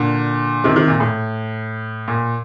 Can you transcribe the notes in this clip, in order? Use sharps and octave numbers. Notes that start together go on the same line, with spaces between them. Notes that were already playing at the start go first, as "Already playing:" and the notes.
Already playing: A#2 D3
C3 D#3
C3 D#3
A#2
A2
A#2